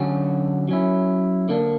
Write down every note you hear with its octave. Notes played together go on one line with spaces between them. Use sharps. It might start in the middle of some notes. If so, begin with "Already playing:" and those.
Already playing: D3 F#3 C#4 F#4
F#3 C#4 E4
D3 A#3 D4